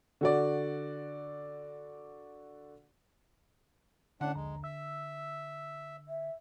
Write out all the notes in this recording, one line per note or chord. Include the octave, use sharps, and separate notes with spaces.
D3 F#4 D5
A2 D3 C#4 D4 F#5
A#1 D#2 G#3 A#5
E5 E6
E5